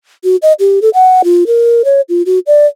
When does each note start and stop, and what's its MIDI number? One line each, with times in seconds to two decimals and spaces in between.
0.24 0.36 66
0.42 0.53 75
0.60 0.79 67
0.82 0.89 69
0.94 1.22 78
1.24 1.44 65
1.47 1.82 70
1.85 2.01 73
2.09 2.22 65
2.26 2.39 66
2.47 2.66 74